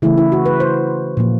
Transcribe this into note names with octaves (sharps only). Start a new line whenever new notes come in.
C#3 E3 A3 E4
E4
F#4
B4
C5
A#2 F3 A#3